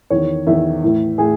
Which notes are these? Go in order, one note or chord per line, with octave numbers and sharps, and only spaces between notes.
E2 D#3 C#5
E2 D#3 E5
A2 E3
A2 G#4